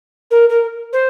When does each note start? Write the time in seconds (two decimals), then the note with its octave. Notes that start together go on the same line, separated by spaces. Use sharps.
0.31 A#4
0.49 A#4
0.93 C5